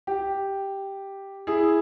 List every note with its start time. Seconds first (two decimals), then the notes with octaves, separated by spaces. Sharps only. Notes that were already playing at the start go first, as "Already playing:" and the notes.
0.07 G4
1.47 E4 G#4